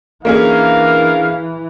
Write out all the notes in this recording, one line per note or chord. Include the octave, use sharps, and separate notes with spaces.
E3 A#3 C#4 D4 G#4 A#4 F5